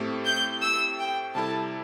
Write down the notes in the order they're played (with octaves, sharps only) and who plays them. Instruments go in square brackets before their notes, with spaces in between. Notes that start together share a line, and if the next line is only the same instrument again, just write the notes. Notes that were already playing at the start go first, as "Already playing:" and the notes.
Already playing: [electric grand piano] A2 A3 C4 G4
[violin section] G6
E6
G5
[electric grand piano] C3 G3 E4 A4 [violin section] A5